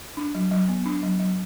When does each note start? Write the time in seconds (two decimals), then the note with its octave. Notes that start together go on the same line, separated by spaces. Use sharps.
0.17 D4
0.35 F#3
0.52 F#3
0.69 B3
0.86 D4
1.03 F#3
1.20 F#3